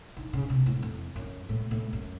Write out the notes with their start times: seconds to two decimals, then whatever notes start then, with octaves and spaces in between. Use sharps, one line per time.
0.17 D#3
0.33 C#3
0.50 C3
0.66 A2
0.82 F2
1.16 F#2
1.49 A2
1.71 A2
1.93 F#2